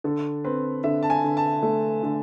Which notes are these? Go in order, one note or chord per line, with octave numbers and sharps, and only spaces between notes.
D3 A4
C4 B4
D3 E5
A5
G#5
D3
A5
A3
D3